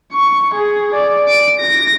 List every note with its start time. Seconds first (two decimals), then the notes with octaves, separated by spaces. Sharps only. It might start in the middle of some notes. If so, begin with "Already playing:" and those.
0.13 C#6
0.55 G#4
0.95 D5
1.28 D7
1.60 A#6